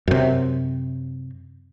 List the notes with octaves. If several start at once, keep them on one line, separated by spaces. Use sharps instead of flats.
F#2 C3